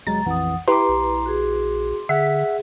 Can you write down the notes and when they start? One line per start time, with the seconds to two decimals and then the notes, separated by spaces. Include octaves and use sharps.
0.07 G1 F#3 G#3 A#5 A6
0.26 A#1 F2 E3 F#5 D#6
0.68 E4 G4 B4 A#5 C6 D6
0.89 A#1
1.26 F#4 G#4
2.09 D3 G#4 E5 F#5 B6